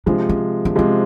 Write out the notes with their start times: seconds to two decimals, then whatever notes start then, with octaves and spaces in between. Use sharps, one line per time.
0.06 C3 F3 G#3 D4
0.29 C#4
0.65 D4
0.76 C3 F3 G#3 C#4